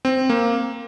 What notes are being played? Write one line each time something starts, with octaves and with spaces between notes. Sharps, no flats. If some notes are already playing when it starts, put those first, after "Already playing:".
C4
A#3